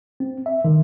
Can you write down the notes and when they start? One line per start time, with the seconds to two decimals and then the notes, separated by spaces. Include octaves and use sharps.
0.20 C4
0.46 E5
0.65 D#3